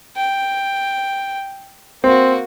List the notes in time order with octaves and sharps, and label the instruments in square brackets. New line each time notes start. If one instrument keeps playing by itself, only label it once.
[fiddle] G5
[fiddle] A#3 F#4 [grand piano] C4